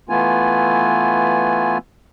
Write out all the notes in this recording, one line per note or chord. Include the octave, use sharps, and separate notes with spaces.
E3 A3 B3 F4 G#5